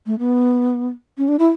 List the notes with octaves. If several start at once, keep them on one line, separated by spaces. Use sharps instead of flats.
A3
B3
C#4
D4
E4